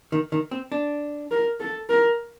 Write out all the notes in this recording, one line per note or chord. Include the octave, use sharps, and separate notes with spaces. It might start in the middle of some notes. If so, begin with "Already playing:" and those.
D#3
D#3
C4
D4
A#4
A4
A#4